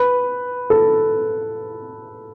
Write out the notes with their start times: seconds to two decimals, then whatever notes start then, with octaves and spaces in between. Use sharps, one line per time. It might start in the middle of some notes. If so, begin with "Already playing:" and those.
Already playing: B4
0.70 A4